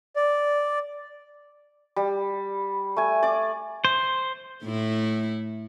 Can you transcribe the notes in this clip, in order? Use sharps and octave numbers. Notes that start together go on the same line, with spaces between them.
D5
G3
A3 G#5
D5 D6
C5
A2 A3 E4